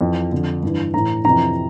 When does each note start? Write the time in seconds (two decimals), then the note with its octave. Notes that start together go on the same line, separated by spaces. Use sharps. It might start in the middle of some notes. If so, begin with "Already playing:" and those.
0.01 F2 E3
0.32 F2 D3
0.63 G2 E3
0.94 A2 E3 A#5
1.25 F2 C3 E3 A#5